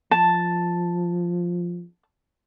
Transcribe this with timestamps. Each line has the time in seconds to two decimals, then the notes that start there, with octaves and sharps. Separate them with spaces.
0.11 F3 A5